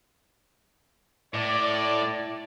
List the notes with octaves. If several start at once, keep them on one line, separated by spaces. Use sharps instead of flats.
A2 D5